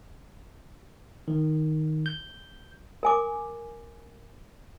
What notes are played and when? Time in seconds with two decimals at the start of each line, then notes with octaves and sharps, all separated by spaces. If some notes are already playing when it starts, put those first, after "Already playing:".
1.28 D#3
2.06 G6
3.03 A#4 G#5 D6